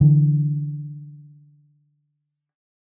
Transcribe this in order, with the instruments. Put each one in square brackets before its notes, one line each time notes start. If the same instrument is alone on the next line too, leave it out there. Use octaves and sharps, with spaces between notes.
[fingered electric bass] D3 E3